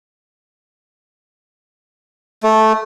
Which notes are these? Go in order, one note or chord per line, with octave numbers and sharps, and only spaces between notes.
A3